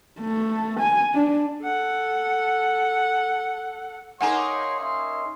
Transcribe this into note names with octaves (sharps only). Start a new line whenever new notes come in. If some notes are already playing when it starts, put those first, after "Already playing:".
A3
G#5
D4
A4 F#5
A#3 D#4 G#4 C#5 F#5 G#5 A#5 C6
C#4 E5 C6